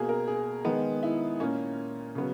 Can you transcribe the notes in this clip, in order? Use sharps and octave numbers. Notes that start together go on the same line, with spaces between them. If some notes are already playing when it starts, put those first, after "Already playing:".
Already playing: B2 A#3 G#4
A#4
G#4
D#3 G#3 B3
E4
A#2 A#3 C#4
C#3 F#3 B3